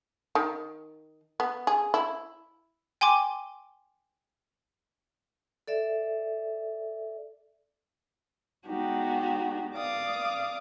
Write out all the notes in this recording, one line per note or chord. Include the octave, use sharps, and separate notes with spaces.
D#3
B3
G#4
E4
G5 G#5 C6 D6
A4 D5 E5
G#3 B3 D4 D#4 F#4 G4
D5 F5 D6 D#6